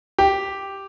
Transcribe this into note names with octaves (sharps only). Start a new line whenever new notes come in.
G4